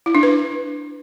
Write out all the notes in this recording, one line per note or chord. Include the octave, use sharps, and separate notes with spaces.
E4
D4
B4